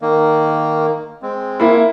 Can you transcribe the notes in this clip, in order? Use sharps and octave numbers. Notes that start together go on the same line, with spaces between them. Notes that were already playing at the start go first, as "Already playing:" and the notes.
D#3 A#3
G#3 C4
A#3 E4